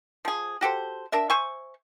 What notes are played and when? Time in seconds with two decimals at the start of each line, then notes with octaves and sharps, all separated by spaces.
0.25 F3 G#4
0.61 F#4 G4 A4 C5
1.12 D4 A#4 E5
1.30 C5 E5 G#5 C#6